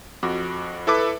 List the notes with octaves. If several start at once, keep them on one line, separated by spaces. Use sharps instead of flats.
F2 F#4 D6
E4 A4 B4 D6